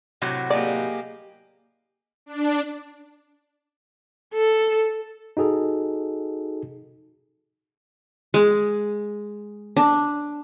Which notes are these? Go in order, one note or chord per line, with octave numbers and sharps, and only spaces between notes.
A2 C3 F#3 F#5 A#6
A#3 G4 G#4 D5 D#5 G#5
D4
A4
D#4 F#4 G#4 A4
G#3
D4